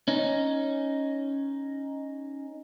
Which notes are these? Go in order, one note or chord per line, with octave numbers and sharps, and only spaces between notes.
C#4 D#4